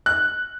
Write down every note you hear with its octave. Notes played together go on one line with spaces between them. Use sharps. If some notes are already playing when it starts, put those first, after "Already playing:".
F#6